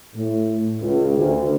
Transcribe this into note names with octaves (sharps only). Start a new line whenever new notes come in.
A2
C#2
D2